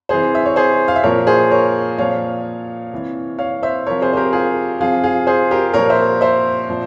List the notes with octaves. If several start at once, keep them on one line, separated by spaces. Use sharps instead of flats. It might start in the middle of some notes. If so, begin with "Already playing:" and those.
C3 E3 G#4 C5
E5
C#5
G#4 C5
F5
E5
A#2 F3 A#4 C#5
G#4 C5
A#4 C#5
A#2 F3 C#5 F5
C3 E3
C#5 F5
C5 E5
C3 F3 A#4 C#5
G#4 C5
C5
G4 A#4
F4 G#4
C3 F3 F4 G#4
F4 G#4
G#4 C5
G4 A#4
A#2 F3 A#4 C#5
C5 E5
C5 E5
A#2 F3